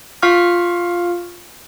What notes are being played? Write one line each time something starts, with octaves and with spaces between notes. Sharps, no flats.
F4 F5 C#6 F6